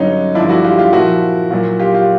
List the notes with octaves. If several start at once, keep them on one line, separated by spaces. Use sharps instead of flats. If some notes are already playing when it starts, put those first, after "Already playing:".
Already playing: G2 D3 F#3 C#4 D#4
G2 D3 F3 D4 E4
E4 F#4
F4 G4
F4 G4
A#2 F3 E4 F#4
A#2 F#3
F4 G4
F4 G4